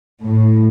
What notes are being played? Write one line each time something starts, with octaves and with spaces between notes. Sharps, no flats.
A2